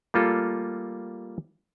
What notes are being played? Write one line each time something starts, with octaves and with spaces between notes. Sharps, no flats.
G3 A3 A#3 F4 A4